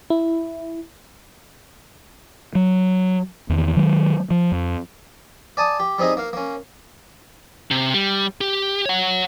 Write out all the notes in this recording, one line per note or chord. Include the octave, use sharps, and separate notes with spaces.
E4
F#3
E2 D#3
D#3 F#3 G#3
F3
F2
D5 G#5 A5 D#6
G4
G3 C4 D#4 G#4 D#5
A#3 F5
A#3 C#4
C3
G3
G4
C#5 F#5